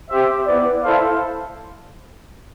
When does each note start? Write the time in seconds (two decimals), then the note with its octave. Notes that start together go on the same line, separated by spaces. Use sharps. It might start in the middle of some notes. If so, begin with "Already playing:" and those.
0.09 C4 G4 C5 E5
0.46 B3 E4 B4 D5
0.83 E4 A4 C5 F5